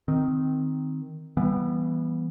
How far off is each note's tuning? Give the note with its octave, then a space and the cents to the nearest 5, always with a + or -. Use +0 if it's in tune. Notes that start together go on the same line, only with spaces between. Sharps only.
D#3 +0 C4 -10
E3 +10 G3 +0 B3 -20